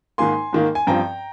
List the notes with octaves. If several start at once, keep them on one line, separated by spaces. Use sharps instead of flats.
G#2 D#3 A#3 G#5 C6
G#2 D#3 A#3
G#5
G2 F3 C4 G5 A#5